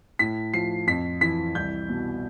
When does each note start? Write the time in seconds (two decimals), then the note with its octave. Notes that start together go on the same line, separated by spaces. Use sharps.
0.19 A2 B6
0.54 F3 C7
0.87 F2 B6
1.21 E3 B6
1.55 C2 G6
1.89 B2